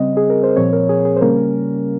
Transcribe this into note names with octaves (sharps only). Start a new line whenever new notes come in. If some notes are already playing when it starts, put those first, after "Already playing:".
Already playing: C#3 G3 C4 D#5
G#4
A#4
C5
A#2 F3 C4 C#5
A#4
G#4
G#4
C5
C#3 G3 A#3 C#4 A#4